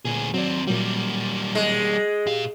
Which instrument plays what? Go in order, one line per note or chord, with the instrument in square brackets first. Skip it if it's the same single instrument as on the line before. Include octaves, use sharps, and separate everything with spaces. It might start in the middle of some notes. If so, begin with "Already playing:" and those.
[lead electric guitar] D2 G#4 [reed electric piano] A#2
[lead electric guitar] D#2 C4 [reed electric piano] F#3 D5
[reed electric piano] A#2 F#3 [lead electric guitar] G3 A#3
[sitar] G#3
[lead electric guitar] A#2 F5 [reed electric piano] G4